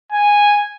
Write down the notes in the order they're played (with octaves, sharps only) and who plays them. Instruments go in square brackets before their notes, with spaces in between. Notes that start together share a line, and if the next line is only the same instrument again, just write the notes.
[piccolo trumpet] G#5